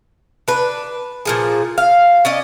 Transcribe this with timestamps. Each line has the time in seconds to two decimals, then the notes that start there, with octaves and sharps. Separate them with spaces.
0.48 D4 B4
1.25 A#2 F3 G#4
1.78 F5
2.25 C#4 D5 D#5